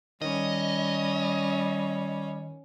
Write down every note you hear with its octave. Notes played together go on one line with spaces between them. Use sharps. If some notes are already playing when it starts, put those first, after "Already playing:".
D#3 G3 C#4 D#5